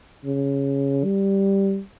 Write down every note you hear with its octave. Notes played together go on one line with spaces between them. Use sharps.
C#3
G3